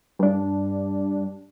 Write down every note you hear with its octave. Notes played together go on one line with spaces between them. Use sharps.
G2 D4